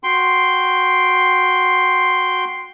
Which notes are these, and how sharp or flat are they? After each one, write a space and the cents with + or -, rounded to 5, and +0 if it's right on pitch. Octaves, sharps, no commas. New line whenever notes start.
F#4 -10 G5 +0 C6 +0